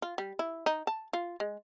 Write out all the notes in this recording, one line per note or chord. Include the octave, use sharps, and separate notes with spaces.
F4
G3
E4
D#4
A5
F4
G#3